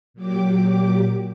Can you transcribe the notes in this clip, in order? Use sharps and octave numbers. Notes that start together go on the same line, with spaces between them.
A#2 F#3 G4 D6